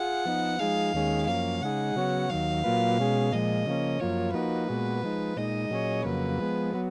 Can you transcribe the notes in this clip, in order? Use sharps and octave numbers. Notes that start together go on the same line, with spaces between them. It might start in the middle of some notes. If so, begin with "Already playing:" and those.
Already playing: F4 G#4 F#5
F3 B3 D#4
F3 G#3 D#4 G#4 F5
D#2 D#3 G#3 C#4 G#4
F#2 F3 A#3 C#4 F5
C#3 G#3 D#4 G#4 F#5
C#3 F#3 B3 F#4 C#5
D#2 D#3 F#3 F5
A#2 F#3 A#3 F4 B4
B2 G#3 C#4 G#4
A#2 F3 G#3 D#5
C#3 F3 A#3 C#4
F#2 F3 A#3 F4 C#5
F3 A#3 D#4 F#4 B4
A#2 G#3 B3 F#4
F3 G#3 D#4
A#2 G#3 D#4 D#5
A#2 F#3 C#4 G#4 C#5
F2 C#3 F#3 A#3 B4
F3 G#3 B3
F#3 B3